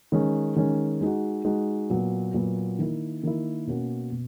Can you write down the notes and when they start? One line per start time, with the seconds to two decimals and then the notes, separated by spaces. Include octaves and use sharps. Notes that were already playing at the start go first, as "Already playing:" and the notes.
0.12 D#3 G#3 C#4
0.56 D#3 G#3 C#4
1.01 G#3 D#4 F#4
1.45 G#3 D#4 F#4
1.90 A#2 F#3 B3 F#4
2.34 A#2 F#3 B3 F#4
2.79 D#3 A#3 E4
3.23 D#3 A#3 E4
3.67 B2 A#3 C#4 F#4
4.12 B2